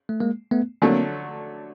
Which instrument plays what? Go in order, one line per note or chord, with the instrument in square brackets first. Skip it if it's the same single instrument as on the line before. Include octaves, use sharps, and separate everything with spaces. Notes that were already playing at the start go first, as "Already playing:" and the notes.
[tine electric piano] A3
G#3 A#3
A3 B3
[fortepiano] D3 F#3 A3 [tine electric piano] A#3 C4